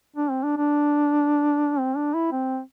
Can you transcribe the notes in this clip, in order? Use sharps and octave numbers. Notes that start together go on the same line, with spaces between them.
D4
C4
D4
D4
C4
D4
E4
C4